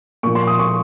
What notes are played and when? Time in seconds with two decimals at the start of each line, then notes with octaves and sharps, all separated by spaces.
0.23 A#2 F3 C#6
0.35 C6
0.47 D#6
0.59 C#6